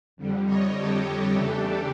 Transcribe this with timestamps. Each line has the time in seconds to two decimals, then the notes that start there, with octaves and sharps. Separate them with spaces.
0.17 F2 D3 G3
0.45 C#5 D#5
0.74 G4 A4
1.31 E2 C#3 E3 A3 D4